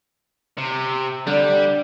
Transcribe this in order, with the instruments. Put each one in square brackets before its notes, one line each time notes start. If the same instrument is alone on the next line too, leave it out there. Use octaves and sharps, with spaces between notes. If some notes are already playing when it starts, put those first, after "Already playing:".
[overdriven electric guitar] C3
[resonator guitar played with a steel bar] D3 [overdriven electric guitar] G3